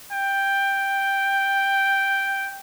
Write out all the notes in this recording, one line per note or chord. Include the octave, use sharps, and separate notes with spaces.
G5